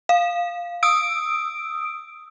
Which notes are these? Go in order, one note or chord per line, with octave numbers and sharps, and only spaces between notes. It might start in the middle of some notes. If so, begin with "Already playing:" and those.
F5
D#6 E6 D7